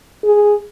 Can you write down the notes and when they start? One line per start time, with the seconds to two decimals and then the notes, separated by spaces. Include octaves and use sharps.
0.24 G#4